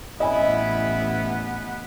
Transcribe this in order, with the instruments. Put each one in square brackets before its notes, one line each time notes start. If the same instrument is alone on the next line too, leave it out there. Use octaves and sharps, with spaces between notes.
[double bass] A1 [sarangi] B3 [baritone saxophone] E4 [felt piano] D#5 G#5 B5